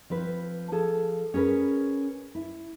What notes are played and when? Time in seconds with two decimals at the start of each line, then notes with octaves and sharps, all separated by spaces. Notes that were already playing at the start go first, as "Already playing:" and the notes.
0.10 F3 C4 B4
0.72 F3 G#4 A4
1.34 C#4 G#4 A#4 B4
2.35 E4